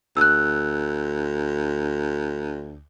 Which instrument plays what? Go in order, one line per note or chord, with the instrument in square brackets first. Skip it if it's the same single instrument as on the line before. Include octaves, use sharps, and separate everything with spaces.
[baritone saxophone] D2 [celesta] E6 F#6